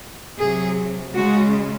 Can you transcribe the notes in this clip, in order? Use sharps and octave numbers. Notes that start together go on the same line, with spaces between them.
C3 F#3 G#4
C#3 G#3 F#4